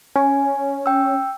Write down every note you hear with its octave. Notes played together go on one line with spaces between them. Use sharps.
C#4 G#5
G5 E6